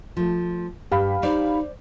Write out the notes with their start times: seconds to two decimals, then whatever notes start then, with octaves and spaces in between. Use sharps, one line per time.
0.17 F3 A3
0.92 G2 G4 F5 B5
1.23 D#4 C5 D5